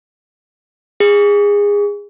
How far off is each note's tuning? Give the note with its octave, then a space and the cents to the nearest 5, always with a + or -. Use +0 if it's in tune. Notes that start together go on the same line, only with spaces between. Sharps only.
G#4 -25